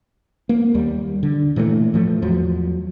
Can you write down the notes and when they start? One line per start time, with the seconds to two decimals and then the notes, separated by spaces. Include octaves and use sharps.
0.49 A#3
0.74 D#2 G3
1.23 D3
1.56 A#2 E3 F#3 A3
1.94 A2 F3 A3
2.22 E2 F3 F#3